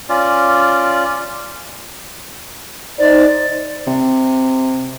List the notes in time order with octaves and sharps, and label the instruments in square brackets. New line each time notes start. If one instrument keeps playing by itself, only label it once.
[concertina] C#4 F4 D5
[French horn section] D#4 C5 [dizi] D5
[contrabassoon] C3